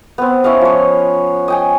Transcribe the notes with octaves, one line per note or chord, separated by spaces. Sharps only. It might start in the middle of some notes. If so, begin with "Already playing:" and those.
B3 C4
C#4 E4 D#5 F5
F3 C#5
D#5 G5 G#5